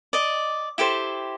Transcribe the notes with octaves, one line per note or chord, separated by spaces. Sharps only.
D5 D#5
E4 G4 A4 C5